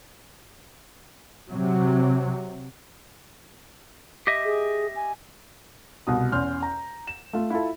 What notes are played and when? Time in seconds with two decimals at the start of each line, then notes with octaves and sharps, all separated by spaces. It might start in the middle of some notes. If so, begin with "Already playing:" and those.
1.49 C3 F#3
4.27 G4 D#5 E5
4.45 G#4
4.96 G#5
6.07 C2 B2 D#6
6.32 E2 C#4 C6 F6 G6
6.63 A#5
7.07 E7
7.33 A3 F4
7.50 E4 F4 A4